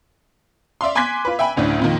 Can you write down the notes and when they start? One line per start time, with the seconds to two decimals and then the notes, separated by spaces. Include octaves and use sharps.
0.81 D5 E5 F5 C6
0.95 G#5 C6 D6 F#6 G#6 B6
1.25 F4 B4
1.39 E5 G5 G#5 B5
1.56 F#1 D2 A2 D4
1.79 F2 A#2 D#3